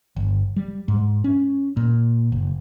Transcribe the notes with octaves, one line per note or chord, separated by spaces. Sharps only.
G1
G3
G#2
C#4
A#2
F#1